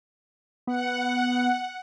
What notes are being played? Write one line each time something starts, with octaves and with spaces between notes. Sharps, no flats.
B3 F#5